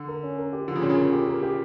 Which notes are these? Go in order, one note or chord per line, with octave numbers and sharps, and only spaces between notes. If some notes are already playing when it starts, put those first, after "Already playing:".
Already playing: D3
A#4
C#4
A#4
G4
D3 F3
C#3
A#2 C#4
C#3
A#4
G4
A#4
G4